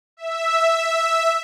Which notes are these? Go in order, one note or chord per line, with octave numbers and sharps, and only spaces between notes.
E5